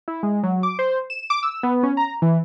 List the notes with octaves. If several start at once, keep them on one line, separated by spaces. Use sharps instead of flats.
E4
G#3
F#3
D6
C5
E7
D6
E6
B3
C#4
A#5
E3